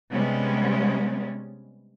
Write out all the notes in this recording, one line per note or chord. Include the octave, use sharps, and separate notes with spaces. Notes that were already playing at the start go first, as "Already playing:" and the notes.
C3 G3 G#3 B3 C#4